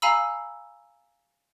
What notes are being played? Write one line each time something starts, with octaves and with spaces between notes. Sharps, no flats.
F5 G#5 A#5 B5 E6